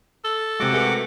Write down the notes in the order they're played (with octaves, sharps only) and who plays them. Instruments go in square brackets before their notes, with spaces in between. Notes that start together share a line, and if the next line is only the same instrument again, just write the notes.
[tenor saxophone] A4
[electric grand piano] C3 G#3 [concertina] F#4 F#5 D6
[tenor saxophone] A3 [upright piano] G#4 A#4 B4